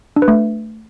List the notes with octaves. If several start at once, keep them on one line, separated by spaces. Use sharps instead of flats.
D4
B4
A3